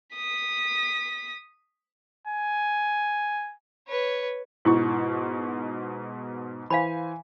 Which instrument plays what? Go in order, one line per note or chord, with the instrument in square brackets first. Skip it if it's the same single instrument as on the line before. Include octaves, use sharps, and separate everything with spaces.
[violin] D#6 B6
[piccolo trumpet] G#5
[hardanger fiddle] B4 C#5
[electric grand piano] G#2 B2 C#6 [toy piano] E4
[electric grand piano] E3 C5 G#5 [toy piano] F5 B5